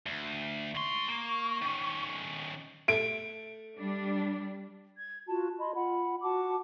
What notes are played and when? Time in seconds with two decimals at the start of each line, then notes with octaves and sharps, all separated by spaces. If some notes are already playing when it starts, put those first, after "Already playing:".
0.06 D2
0.75 G#2 C6 C#6
1.08 A#3
1.62 D#3 C#4
2.88 A3 D7
3.78 G3 D4
4.97 G#6
5.27 F4 F#4 A5
5.59 D#5 B5 C6
5.75 F4 F#5 B5
6.23 F#4 F#5 A5 D6